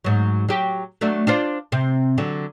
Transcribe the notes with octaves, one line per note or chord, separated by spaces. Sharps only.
G#2 F#3
F#3 G4
F#3 A3 D4
D4 F4 C5
C3 C4
D3 F#3